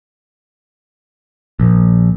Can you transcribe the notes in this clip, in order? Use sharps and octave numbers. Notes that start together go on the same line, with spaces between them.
A#1